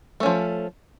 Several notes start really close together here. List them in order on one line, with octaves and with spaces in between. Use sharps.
A3 C#4 F3